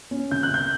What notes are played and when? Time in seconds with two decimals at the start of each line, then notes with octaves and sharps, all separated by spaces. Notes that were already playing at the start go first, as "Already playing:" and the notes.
0.11 C#4
0.31 C#3 G6
0.43 F#6
0.51 C#3 G6